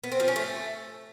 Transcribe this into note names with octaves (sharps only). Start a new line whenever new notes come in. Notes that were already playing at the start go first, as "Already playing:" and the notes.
B3
C4
F3
C#4
A3